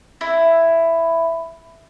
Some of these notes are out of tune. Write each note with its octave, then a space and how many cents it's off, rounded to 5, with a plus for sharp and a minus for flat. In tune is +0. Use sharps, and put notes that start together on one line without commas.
E4 +5